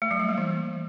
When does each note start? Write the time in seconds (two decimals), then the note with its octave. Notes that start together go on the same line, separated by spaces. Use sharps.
0.02 A3
0.11 F#3
0.20 G3
0.29 A#3
0.38 E3